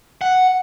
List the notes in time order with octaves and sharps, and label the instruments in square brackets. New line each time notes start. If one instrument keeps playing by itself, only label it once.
[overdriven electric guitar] F#5